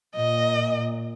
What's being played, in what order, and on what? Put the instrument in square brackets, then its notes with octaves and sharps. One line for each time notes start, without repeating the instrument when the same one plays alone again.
[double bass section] A#2 [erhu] D#5